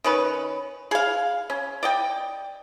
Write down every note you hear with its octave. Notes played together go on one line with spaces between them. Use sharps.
D#3 C#4 B4
G#4 F5
C#4
D5 D#5 G5